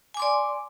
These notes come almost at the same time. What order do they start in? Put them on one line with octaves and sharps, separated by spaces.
G#5 D6 C6 D5